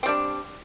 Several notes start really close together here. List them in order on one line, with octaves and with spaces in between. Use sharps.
C4 G3 D4